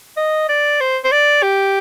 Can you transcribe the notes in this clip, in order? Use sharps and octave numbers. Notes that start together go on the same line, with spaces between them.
D#5
D5
C5
C5
D5
G4